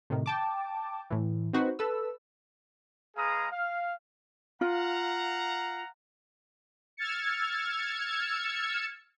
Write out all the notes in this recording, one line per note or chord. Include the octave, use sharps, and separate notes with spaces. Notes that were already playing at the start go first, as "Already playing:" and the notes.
A2 C3 D#3
G5 A5 D6
A2 E3
C4 D#4 F#4 B4 C5
A4 B4 E6
G#3 G#4 B4 F5 A#5 D#6
F5
F4 F5 F#5 A#5
E6 F6 G#6 A6 C#7